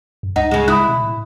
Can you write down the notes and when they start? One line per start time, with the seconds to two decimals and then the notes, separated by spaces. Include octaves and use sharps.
0.23 F#2
0.36 C#2 D#4 F#5
0.51 C#3 G#3
0.68 E4 B5 D#6 F#6
0.88 B2
1.04 A2